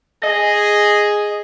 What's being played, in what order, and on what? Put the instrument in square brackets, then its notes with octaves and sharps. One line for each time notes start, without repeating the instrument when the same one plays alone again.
[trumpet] G#4 [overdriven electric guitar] D#5